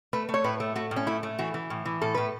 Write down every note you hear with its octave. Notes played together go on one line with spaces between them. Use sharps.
A3 B4
A3
C#5
A2 B4
A3
A3 F#4
A2
C#4
A3 E4
A3
E3 F#4
E3
A2
E3
A2 A4
A2 B4